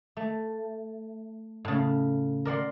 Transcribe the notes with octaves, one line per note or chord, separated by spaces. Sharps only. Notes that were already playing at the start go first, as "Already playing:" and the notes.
A3
A2 C#3
A#4 D5 F#5 C6